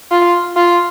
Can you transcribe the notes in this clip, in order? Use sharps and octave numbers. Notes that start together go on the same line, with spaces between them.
F4
F4